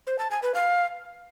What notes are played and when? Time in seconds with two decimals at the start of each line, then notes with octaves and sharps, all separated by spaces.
0.07 C5
0.19 A5
0.31 G#5
0.43 B4
0.55 F5